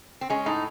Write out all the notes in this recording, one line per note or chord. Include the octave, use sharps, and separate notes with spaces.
C4
G#3 C#4
A2 D#4